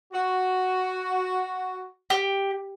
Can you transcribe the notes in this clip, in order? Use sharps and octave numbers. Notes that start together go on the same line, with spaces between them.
F#4
G4